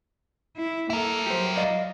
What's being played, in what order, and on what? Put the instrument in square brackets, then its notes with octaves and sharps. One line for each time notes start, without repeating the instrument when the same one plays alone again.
[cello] E4
[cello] A#3 A4 [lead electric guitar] E4 A#4
[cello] F#3 [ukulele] G4 C5
[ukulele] D5 D#5 F5